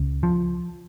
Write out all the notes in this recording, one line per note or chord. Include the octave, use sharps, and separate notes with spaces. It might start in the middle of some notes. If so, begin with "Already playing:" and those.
Already playing: C#2 C#3
F3